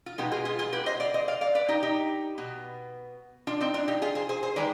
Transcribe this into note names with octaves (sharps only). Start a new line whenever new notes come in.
F4
B2 G#3 B3 D#4 G4
F4 G#4
F4 G#4
F4 G#4
G4 B4
C5 D#5
D5 F5
C5 D#5
D5 F5
D5 F5
B4 D5
D#4 G4
D#4 G4
B2 B3
D4 F4
C4 D#4
D4 F4
D#4 G4
F4 G#4
G#4 C5
G#4 C5
G#4 C5
D#3 G#3 B4 D5